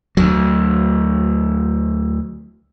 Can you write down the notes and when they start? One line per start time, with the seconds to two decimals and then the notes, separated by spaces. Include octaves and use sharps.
0.17 D2 F#3